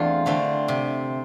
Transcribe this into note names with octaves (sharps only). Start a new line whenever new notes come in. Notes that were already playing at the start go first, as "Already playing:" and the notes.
Already playing: E2 A3 C4 D4 F4
D3 A3 C4
C3